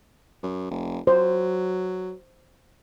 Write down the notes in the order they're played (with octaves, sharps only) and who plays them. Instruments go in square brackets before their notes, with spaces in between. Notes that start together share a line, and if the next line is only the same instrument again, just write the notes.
[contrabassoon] F#2
F1
[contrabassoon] F#3 [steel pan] C5